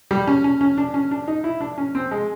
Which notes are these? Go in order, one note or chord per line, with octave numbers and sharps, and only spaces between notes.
G3
C#4
C#4
C#4
D4
C#4
D4
D#4
E4
D4
C#4
C4
G#3